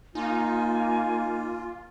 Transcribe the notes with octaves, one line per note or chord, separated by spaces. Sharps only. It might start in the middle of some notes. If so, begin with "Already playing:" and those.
A#3 D#4 F4 G#5